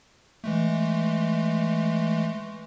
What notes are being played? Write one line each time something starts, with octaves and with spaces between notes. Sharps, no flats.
E3 G#3 A3